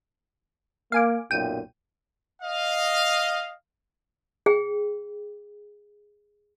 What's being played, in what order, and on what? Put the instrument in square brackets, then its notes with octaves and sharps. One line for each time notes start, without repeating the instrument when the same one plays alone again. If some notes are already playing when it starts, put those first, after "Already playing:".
[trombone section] A#3 [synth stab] F5 G#5 D6
[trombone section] B1 F#2 A#2 [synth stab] G5 D#7
[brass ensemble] D#5 F5
[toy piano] G#4 G5